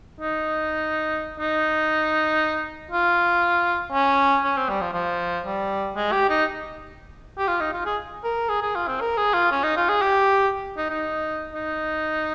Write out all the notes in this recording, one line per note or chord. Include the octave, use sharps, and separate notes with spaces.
D#4
D#4
F4
C#4
C#4
C4
G3
F3
F3
G3
G#3
G4
D#4
G4
F4
D#4
F4
G#4
A#4
G#4
G#4
F4
C4
A#4
G#4
F4
C#4
D#4
F4
G#4
G4
D#4
D#4
D#4